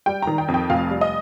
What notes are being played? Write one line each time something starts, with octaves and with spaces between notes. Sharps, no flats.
G3 G5
D#3 A#5
G5
F2
G5
F1 F5
G3
D#5